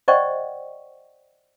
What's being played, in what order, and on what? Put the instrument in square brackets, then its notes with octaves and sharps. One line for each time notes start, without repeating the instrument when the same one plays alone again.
[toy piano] C5 D5 D#5 F#5 G5 C#6